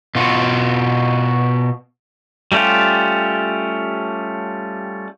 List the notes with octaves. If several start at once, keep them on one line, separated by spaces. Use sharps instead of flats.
B2 F4 F#4
G3 A3 C#4 F4 G4